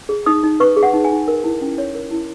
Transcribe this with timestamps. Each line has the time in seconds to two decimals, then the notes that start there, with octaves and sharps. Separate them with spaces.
0.09 G#4
0.26 D#4 D#6
0.43 D#4
0.60 B4 C#6
0.76 G#4
0.83 F#5
0.93 D#4
1.04 G#5
1.11 D#4
1.28 A#4
1.44 E4
1.61 C#4
1.78 C#5
1.95 A#4
2.11 E4